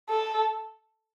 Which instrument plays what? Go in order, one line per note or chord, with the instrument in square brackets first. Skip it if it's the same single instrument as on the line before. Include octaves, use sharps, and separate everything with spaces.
[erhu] A4